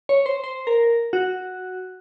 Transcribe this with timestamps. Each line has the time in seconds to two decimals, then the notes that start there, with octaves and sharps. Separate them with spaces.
0.09 C#5
0.26 C5
0.44 C5
0.67 A#4
1.13 F#4